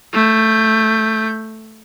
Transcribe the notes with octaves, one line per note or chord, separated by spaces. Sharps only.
A3 G6